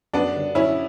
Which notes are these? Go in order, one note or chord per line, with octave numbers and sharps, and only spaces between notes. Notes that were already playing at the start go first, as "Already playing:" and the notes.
F#2 B3 D4
D3 G3 D4
F#2 C#4 E4